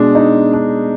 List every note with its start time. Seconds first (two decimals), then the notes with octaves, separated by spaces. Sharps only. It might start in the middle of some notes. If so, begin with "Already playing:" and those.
Already playing: B2 G#3 D4
0.15 D#4
0.53 D4